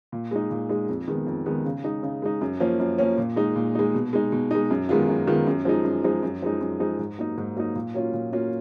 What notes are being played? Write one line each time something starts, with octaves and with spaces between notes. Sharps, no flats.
A#2
G#3 D#4
A#2
G#3 D#4
F2
D#3 G#3 B3
F2
D#3 G#3 B3
C#3
G#3 D#4
C#3
G#3 D#4
F#2
F3 A#3 C#4
F#2
F3 A#3 C#4
A#2
G#3 D#4
A#2
G#3 D#4
B2
G#3 D#4
B2
G#3 D#4
F#2
D#3 G#3 B3 F4
F#2
D#3 G#3 B3 F4
F#2
F3 G#3 D#4
F#2
F3 G#3 D#4
F#2
F3 G#3 D#4
F#2
F3 G#3 D#4
G#2
F#3 A#3 D#4
G#2
F#3 A#3 D#4
A#2
F#3 A#3 C#4 F4
A#2
F#3 A#3 C#4 F4